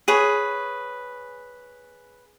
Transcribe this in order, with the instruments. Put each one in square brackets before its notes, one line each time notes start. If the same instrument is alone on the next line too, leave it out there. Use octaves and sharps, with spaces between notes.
[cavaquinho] G#4 B4 C#5